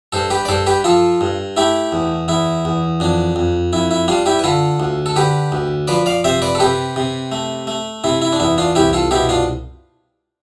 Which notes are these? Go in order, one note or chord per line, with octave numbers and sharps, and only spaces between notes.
G2 A4 C5
G4 B4
D5
G2 A4 C5
G4 B4
F3 F4 A4
G2
A3 E4 G4
E2
E2 E4
E2
F2 D4
F2
F2 E4
E4
G3 D4 F4
E4 G4
B4
D3 F4 A4
D2
A4
D3 G4 B4
D2
F3 B4 D5
D5 F5
C3 C5 E5
B4 D5
A4
C3 G4 B4
C3
A3
A3
C3 E4
E4
D4
E2 E4
D4 F4
C2 E4 G4
F4 A4
B2 E4 G4
D4 F4